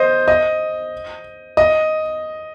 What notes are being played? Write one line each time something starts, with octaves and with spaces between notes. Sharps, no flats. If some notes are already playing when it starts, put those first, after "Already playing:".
Already playing: C5 D#5
D#5
D#5